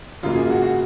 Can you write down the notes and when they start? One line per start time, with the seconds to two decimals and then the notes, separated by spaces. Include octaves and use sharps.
0.23 G#1 F#2 C#3 F#3 A#3 F4
0.36 G#4
0.50 F#4
0.62 F#4